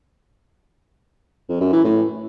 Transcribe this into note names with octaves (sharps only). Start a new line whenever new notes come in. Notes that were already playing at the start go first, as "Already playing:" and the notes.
F2
F#2
E3
A2